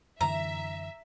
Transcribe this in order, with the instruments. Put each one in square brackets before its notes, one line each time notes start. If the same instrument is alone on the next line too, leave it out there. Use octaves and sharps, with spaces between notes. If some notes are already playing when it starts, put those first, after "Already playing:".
[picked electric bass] F#2 D3 E3 [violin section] E5 [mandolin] A#5